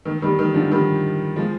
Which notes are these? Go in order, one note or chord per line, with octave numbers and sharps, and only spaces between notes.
D#3
D#3 G3
D#3
D3 F3
D#3 G3
F3 G#3